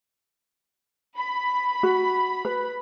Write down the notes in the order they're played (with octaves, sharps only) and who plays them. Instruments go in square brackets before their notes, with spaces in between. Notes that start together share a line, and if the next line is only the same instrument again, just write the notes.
[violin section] B5
[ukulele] F#4
B4